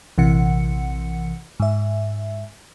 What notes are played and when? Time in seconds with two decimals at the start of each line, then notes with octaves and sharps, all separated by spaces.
0.18 A#1 C3 E3 F#5 C#7
1.60 G#2 E5